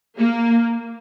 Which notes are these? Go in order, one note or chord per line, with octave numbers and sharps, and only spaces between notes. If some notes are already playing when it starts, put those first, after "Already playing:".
A#3